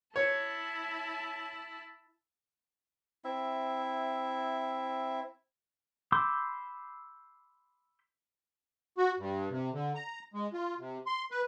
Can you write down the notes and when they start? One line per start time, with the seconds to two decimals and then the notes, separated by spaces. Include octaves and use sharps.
0.16 E4 C#5 A5
3.25 C4 E4 E5
6.12 B5 C6 D6 E6 G6
8.98 F#4
9.19 G2
9.51 C3
9.73 D3
9.95 A#5
10.34 G#3
10.53 F4
10.79 C3
11.06 C6
11.31 B4